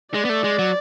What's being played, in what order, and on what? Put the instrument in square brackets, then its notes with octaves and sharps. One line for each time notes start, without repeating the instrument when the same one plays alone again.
[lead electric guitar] G#3 [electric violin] D5
[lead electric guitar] B3
A3
G#3
F#3